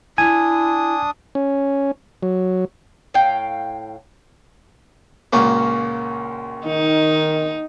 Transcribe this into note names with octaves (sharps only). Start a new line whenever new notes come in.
D4 E4 G#5 D#6
C#4
F#3
A2 F5 G5
C#2 A#2 A#3 C#4 F#4
D#3 D#4